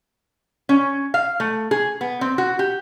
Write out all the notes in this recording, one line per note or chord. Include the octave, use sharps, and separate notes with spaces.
C#4
F5
A3
G#4
B3
C4
F#4
G4